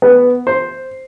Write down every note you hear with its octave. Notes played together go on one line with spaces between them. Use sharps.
B3
C5